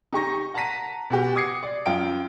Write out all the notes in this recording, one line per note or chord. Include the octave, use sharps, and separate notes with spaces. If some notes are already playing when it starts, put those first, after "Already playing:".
D#4 G4 C#6 A#6
F#5 A5 A#5 A#6 B6 D#7
B2 F#4 G4
D6 D#6 G#6 C7 C#7
D5
F#2 F4 G5 D7